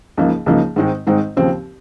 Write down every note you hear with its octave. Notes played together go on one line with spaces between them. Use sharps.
C#2 C#3 F3 A#3 D#4
C#2 C#3 F3 A#3 D#4
G#2 D#3 G#3 C4 D#4
G#2 D#3 G#3 C4 D#4
D#2 C#3 F3 C4